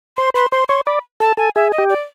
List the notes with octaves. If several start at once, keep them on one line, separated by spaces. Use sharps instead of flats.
C5 C6
B4 C6
C5 C6
C#5 C6
D5 B5
A4 A5
A4 G#5
G#4 E5
D#5
G4
D5